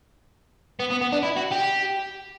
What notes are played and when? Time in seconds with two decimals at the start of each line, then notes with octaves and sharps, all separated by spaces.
0.80 B3
0.91 B3
1.02 B3
1.12 D4
1.23 E4
1.36 F#4
1.51 G4